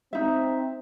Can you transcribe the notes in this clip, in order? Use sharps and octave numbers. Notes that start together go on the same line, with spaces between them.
C4 D#4 E5